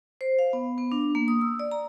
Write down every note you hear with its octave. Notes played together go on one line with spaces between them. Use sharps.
C5
F5
B3
B3
D4
A#3
D#6
E6
D5
A#5